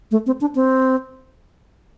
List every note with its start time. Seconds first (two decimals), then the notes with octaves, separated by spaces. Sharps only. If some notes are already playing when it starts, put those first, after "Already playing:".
0.11 A3
0.26 C4
0.41 D4
0.55 C4